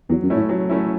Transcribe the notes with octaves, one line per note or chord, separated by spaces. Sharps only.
E2 F#3
F#2
A3 C#4 E4
A2
F#3
A3 C#4 E4